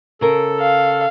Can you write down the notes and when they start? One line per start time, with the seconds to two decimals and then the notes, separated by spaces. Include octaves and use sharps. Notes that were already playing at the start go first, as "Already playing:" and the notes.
0.21 C#3 A4 A#4
0.61 F5